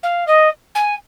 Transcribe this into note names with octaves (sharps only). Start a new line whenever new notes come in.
F5
D#5
G#5